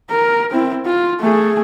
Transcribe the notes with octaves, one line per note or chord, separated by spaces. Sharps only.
A#4
C4 E4
F4
A3 G#4